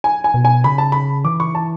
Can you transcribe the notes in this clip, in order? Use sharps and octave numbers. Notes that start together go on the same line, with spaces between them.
G#5
G#5
B2
G#5
C#3 B5
A5
B5
E3 D6
C#6
A5